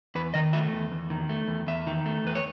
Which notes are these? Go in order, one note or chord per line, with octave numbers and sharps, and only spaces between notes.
E2 B4
D#3 D#5
A3 E5
E2
E2
D#3
A3
E2
E2 E5
D#3
A3
E2 B4
C#5